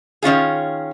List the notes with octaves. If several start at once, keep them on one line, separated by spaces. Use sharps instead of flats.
D#3 C#4 F4 G#4